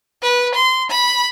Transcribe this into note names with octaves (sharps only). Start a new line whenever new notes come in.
B4
C6
B5